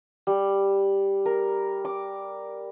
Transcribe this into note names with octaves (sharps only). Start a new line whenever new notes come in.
G3
A#4
D6